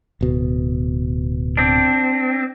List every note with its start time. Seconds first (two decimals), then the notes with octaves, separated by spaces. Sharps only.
0.21 D1 B2
1.57 C4 D4